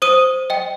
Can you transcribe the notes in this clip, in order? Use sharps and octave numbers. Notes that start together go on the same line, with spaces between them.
C5 D#6 D#7
D#5 G5